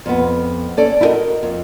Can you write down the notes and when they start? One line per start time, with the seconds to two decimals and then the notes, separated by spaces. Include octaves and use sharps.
0.06 F2 B3
0.77 C#4 A4 D5
1.01 E4 F#4 G4 A#4 D#5
1.43 F2